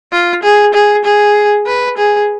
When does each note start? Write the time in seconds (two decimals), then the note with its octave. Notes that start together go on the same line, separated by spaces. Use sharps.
0.12 F4
0.43 G#4
0.74 G#4
1.05 G#4
1.67 B4
1.98 G#4